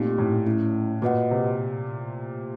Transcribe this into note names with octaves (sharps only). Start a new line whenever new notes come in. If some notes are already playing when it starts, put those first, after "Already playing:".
Already playing: A#2 A3 C4 D#4 G4
A2
A3 C#4 E4
A#2 F#4 B4 D#5 F#5
C3